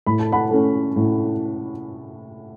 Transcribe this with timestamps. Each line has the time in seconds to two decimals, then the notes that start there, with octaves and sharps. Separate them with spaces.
0.07 A2 B5
0.19 A5
0.32 F#5 B5
0.51 A3 C#4
0.96 A2